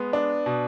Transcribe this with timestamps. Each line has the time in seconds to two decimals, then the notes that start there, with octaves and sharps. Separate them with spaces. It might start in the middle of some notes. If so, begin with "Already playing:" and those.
Already playing: G#3 B3
0.13 D4
0.46 B2